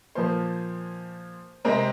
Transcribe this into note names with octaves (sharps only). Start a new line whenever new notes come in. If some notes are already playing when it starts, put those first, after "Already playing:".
A#2 F3 A#3 C5
C3 G#3 C4 A#4